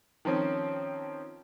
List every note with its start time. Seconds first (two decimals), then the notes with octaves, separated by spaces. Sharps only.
0.25 D#3 F3 C4 C#4